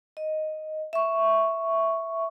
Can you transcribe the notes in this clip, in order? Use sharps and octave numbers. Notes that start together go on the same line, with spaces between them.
D#5
E5 C#6